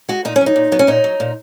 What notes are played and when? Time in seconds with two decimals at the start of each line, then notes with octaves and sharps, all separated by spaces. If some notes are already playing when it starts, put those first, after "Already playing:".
0.09 G#3 F#4
0.25 A#2 D#4
0.36 C#4
0.41 F#3
0.46 D#4
0.56 A#2
0.72 F#3 B3
0.79 C#4
0.87 A#2 D#4
1.04 F#3
1.20 A#2